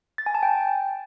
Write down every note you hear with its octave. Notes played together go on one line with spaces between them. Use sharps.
A6
G#5
A5
G5